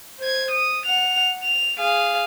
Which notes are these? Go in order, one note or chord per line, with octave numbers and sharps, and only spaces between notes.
C5 G#6
D#6
F#5 F7
F7
G#4 F5